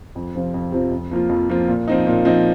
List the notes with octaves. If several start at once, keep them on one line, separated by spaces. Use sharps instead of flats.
F2
C3 F3 C4 F4
F2
C3 F3 C4 F4
F2
F3 A#3 F4
F2
F3 A#3 F4
A#2
F3 C4 D#4
A#2
F3 C4 D#4